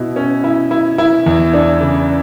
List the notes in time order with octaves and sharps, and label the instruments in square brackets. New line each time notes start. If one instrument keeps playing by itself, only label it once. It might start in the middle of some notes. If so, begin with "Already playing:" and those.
Already playing: [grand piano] B2 E4
C#4
E4
E4
E4
E2
D4
C#3